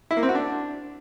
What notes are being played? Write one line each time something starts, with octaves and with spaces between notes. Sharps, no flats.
E4
A#3
C4
F#4
D4